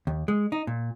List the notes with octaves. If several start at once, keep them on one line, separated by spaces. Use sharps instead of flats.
D#2
G#3
D#4
A#2